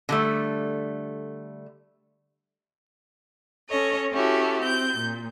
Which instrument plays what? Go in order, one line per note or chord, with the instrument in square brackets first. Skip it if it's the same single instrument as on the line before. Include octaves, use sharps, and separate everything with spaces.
[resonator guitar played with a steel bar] D3 G3 A3
[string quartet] C#4 A4 C#5 D#5
C#4 E4 F#4 G4 A4
C4 G6
A#2